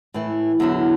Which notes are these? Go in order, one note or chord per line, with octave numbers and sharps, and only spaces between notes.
A2 E3
E2 D3 F#3